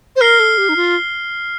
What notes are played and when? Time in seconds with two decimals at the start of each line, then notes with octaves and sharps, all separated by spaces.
0.16 C5
0.21 A#4 F6 C7 G7
0.39 A4
0.58 G4
0.69 D#4
0.76 F4